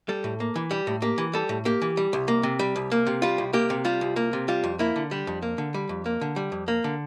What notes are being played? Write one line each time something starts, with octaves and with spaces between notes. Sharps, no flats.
G3 A4
A2
A#3
E3
G3 G4
A2
A#3 G4
E3
G3 A4
A2
A#3 G4
E3
G3
C2
A#3
C3
G3
C2
A#3
C3
G3 F4
C2
A#3 G4
C3
G3 F4
C2
A#3
C3
G3 F4
F2
A#3 E4
D3
G3 D4
F2
A#3
D3
G3
F2
A#3
D3
G3
F2
A#3
D3